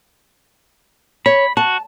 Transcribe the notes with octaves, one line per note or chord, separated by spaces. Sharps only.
C#5 B5
F#4 A5